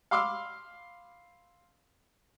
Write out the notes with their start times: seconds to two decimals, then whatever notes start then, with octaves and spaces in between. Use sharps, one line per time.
0.11 F5 B5 C6 D6 E6 F6